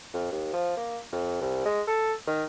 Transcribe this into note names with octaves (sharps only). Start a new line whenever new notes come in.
F2
D#2
F3
A#3
F2
C2
G#3
A4
D#3